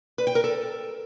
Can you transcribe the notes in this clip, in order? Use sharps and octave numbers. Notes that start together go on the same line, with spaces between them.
B4
G5
A#4
A4